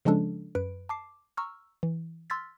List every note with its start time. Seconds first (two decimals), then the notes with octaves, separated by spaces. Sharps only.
0.05 C#3 F3 G#3 C#4 D4 A4
0.55 F#2 B4 D7
0.89 A5 D6 C7
1.37 A#5 C#6 E6 F6
1.83 E3
2.30 C6 E6 F6 G#6 A6 B6